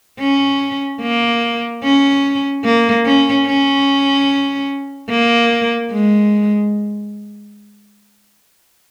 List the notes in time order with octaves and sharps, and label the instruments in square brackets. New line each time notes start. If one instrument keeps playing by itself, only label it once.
[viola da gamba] C#4
A#3
C#4
A#3
C#4
C#4
A#3
G#3